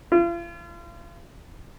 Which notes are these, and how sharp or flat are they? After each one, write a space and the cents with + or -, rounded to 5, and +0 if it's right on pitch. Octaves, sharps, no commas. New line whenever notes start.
F4 -40